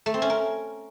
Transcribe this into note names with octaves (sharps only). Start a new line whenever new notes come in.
A3
C4
C#4
A#4